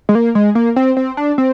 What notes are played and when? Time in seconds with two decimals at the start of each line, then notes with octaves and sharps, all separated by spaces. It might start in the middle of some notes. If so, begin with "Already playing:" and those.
0.09 G#3
0.15 A#3
0.35 G#3
0.55 A#3
0.76 C4
0.97 C4
1.17 D4
1.38 C4